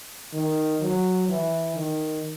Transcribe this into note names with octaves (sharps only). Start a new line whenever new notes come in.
D#3
F#3
E3
D#3